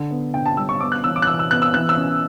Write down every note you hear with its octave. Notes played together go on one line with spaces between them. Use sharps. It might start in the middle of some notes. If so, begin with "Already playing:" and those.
Already playing: D3
B3
D3 G5
A5
G3 E6
C#6
B3 D6
F#6
E3 E6
D6
F#6
E3 E6
E6
B3 F#6
E6
E3 F#6
E6
C#4